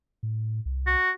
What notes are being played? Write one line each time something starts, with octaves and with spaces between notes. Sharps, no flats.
A2
C2
F#4